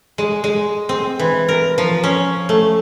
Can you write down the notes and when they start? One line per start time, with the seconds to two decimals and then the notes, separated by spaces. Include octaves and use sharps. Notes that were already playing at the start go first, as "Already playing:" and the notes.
0.18 G#3
0.44 G#3
0.89 C4
1.19 E3
1.48 A#4
1.78 F3
2.04 C#4
2.49 A3